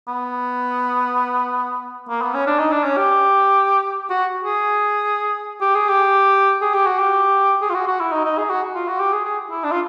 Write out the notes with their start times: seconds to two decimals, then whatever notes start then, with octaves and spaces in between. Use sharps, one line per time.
0.08 B3
2.09 A#3
2.21 B3
2.34 C#4
2.47 D4
2.59 D#4
2.72 D4
2.84 C#4
2.97 G4
4.10 F#4
4.43 G#4
5.61 G4
5.75 G#4
5.89 G4
6.62 G#4
6.74 G4
6.86 F#4
6.99 G4
7.62 G#4
7.70 F4
7.74 F#4
7.87 F#4
8.00 E4
8.12 D#4
8.25 D#4
8.38 G#4
8.50 F#4
8.75 F4
8.88 F#4
9.00 G4
9.13 G#4
9.25 G#4
9.50 E4
9.64 D4
9.72 F4